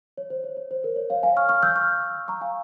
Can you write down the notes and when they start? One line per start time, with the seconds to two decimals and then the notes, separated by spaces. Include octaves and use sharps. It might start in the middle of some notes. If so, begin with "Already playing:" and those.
0.18 C#5
0.30 C5
0.44 C#5
0.57 C#5
0.71 C5
0.84 A#4
0.96 C#5
1.10 C#5 F5
1.23 F5 G#5
1.37 C#6 F6
1.49 C#6 F6
1.63 E6 G6
1.76 C#6 F6
2.28 A#5 C#6
2.41 F5 G#5